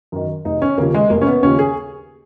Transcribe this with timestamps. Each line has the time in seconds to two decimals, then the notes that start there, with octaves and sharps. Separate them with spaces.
0.12 F#2 D#3
0.45 F1 D#4
0.62 C#4
0.78 D#2 C#3 F3 A#3
0.94 G#3
1.10 F1 A#3
1.21 C#4
1.26 B3
1.43 D#2 C#3 F3 C#4
1.59 G#4